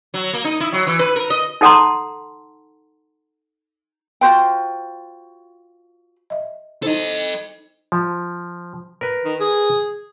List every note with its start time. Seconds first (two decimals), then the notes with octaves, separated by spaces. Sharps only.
0.14 F#3
0.33 A#3
0.44 D#4
0.60 E4
0.72 F#3
0.87 E3
0.99 B4
1.16 A#4
1.30 D#5
1.61 D#4 A4 F#5 A5 A#5 C6
4.21 F4 F#4 C5 G5
6.30 D#5 E5
6.83 D#4 E4 A4 C5 D#5
7.92 F3
9.01 A#4 B4
9.25 D#3
9.40 G#4